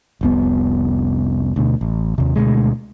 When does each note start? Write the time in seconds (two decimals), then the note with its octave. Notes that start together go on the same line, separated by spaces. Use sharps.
0.21 F1 C2 B3
1.56 D2 B2
1.81 A1
2.18 D#2 C3
2.36 D2 B2 G#3